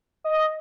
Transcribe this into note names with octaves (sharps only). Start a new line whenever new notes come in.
D#5